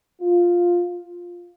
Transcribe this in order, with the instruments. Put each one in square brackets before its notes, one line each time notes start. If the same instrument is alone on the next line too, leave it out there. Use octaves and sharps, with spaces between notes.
[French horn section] F4